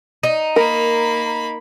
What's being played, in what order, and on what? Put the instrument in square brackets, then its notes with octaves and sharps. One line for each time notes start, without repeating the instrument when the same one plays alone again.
[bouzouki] D#4
[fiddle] A#3 B5 [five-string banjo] A#4